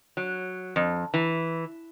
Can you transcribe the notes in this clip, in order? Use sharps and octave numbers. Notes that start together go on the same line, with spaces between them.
F#3
F2
E3